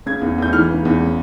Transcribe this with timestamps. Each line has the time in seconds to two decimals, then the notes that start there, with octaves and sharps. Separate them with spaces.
0.06 C#3 G#6
0.21 E2
0.38 E2 G6
0.53 E3 F6
0.69 C#3
0.85 E2
1.01 C#3